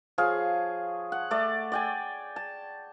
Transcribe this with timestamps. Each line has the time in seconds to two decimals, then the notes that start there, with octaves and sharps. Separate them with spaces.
0.18 F3 G#4 C#5 F5
1.12 F#5
1.31 A3 D5
1.72 D5 G5 G#5
2.36 A5